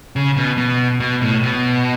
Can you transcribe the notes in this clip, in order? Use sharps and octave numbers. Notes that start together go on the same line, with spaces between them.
C#3
B2
B2
B2
A2
B2